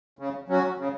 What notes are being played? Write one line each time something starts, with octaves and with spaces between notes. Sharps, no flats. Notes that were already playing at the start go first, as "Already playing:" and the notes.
C#3
F#3 C#4 F#4
C#3